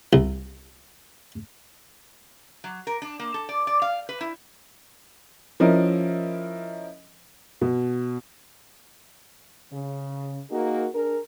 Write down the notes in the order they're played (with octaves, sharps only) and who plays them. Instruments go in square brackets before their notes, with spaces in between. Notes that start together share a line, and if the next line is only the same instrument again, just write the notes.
[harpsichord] C2
[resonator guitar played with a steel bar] F#3
A#4
D4
A#3
A4
D5
D5
F5
B4
E4
[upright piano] F3 C#4 E4 A#4 D#5
B2
[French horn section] C#3
A#3 D#4 F#4 G#4 A#4
D4 G#4 A#4